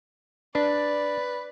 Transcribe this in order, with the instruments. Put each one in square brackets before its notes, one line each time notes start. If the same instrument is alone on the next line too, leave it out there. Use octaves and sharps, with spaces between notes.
[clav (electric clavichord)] D4 [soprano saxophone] B4 [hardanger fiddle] D5